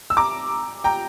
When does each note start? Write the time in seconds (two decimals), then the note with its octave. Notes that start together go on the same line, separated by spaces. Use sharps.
0.10 E6
0.17 A#5 D6
0.84 G5 A#5